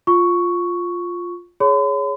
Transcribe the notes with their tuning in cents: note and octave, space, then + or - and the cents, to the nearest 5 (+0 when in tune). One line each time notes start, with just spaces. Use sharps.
F4 +5 C#6 +5
G#4 +0 C#5 +10 B5 +45